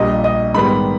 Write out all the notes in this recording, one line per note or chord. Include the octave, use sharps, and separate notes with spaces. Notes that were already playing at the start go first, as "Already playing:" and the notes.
Already playing: A#1 A#2 G3 D#5
D#5
G#2 D#3 G3 B3 B5